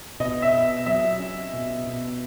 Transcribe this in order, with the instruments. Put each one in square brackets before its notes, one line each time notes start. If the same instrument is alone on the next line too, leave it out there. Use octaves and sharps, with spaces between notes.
[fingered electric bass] B2 [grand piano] D#5
[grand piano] E5
[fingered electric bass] B2
[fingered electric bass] F#3 [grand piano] E5
[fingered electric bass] C#4
B2
B2